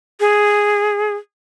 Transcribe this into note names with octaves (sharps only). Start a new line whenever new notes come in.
G#4